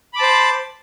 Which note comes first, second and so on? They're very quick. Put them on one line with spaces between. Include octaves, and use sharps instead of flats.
B5 D6 A5 C5